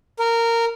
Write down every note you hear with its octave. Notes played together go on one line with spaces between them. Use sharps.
A#4